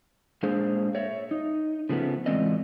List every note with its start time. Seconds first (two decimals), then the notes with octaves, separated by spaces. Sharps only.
0.43 A#2 G#3 D4 G#4 C5 F5
0.95 C#5 E5
1.31 D#4
1.89 C#3 F3 A3 B3
2.26 A2 E3 G#3 C4 D5 D#5